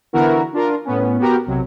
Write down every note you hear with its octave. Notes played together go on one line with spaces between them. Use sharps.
D3 E3 B3 E4 F#4 A#4
D4 F4 A#4
A2 B3 C#4
B3 F#4 G4 A#4
B1 C3 F#3